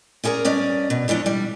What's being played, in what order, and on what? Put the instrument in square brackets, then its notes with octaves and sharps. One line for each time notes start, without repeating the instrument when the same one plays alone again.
[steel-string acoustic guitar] C#4 E4 G#4 A#4 D5
G2 C#4 D5 D#5
B2
E2 E3 F3 D4 C#5
G3